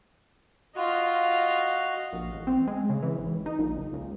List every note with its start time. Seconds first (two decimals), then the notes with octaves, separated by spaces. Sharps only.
0.76 F4 F#4 D#5 F5
2.13 A#1
2.34 A1
2.47 C4
2.67 G#3
2.89 C#3
3.03 E3
3.18 G#1
3.46 D#4
3.59 A#1
3.77 F#1
3.93 C#2